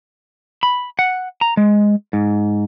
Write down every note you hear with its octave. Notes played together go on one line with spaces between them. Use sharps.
B5
F#5
A#5
G#3
G#2